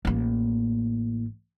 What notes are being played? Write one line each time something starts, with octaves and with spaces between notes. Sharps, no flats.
A1 A#3